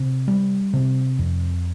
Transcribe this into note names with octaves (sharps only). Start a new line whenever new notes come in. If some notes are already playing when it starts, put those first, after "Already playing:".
Already playing: C3
G3
C3
F2